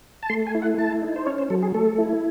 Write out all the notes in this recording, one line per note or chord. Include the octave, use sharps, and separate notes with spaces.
A5
A3 C6
G#5
E4
F#5
A3 A5
D#4
C5
C#4 C#5
C5
F#3 A4
G#4
A3 A4
E4